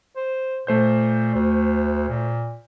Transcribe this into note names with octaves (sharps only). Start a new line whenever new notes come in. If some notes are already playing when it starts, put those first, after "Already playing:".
C5
A#2 A3 C5 G6
D2
A#2